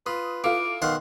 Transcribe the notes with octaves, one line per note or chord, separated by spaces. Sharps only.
F4 B4 D#6
E4 F4 A4 F5 D6
B1 D#3 F5 F#5 C6